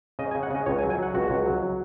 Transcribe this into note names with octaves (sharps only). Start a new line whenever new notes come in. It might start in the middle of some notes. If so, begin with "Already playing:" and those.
C#3 D#5
G#5
C#3
F#5
C#3 D#5
C#2 C#5
G#5
F#3
G#5
F#3 F#5
C#2 F#4
C#2
F#3
F#3